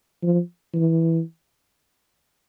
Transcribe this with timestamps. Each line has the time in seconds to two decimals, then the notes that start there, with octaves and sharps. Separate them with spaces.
0.23 F3
0.74 E3